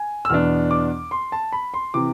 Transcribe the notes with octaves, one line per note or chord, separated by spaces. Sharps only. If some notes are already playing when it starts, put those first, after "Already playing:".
Already playing: G#5
E6
E2 B2 B3 D4 F6
D6
C6
A5
B5
C6
C3 E3 D6